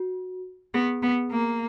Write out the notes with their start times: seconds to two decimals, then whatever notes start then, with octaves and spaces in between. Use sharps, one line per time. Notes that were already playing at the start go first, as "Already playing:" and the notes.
Already playing: F#4
0.74 B3 G#4
1.03 B3
1.31 A#3